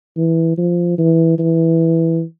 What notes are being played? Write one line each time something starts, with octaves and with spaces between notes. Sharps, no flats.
E3
F3
E3
E3